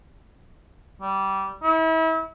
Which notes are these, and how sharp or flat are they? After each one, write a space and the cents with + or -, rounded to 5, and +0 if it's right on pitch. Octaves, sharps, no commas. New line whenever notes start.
G3 -20
E4 -35